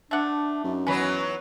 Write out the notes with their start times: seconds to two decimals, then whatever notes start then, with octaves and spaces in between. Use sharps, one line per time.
0.11 A3 D4 F#5
0.64 F#2 D#4
0.87 E3 F#3 B3 C#4 B4